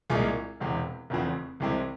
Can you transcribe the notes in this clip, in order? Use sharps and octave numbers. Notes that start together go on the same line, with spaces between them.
C2 A#2 G#3 F4 G#4
E1 E2 C3
F1 E2 C#3 F3 C4
C2 C3 E3 G#3 C4